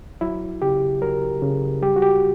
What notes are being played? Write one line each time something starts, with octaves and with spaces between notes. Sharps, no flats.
F#3 E4
C#3 G4
F#3 A#4
C#3
G3 G4
F#4
G4